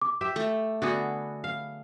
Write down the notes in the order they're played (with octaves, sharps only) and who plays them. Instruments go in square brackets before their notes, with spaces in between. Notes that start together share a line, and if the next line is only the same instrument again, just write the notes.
[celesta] D6
[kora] G4 E5
[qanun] A3
[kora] D3 F#4 G#4 [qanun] B3
[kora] F5